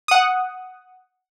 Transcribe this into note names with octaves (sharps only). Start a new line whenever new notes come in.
F#5 D#6